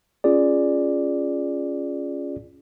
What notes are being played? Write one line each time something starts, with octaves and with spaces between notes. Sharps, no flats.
C#4 F4 G#4 D5